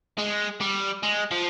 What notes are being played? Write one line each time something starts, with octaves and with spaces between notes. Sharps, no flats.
G#3
G3
G#3
F3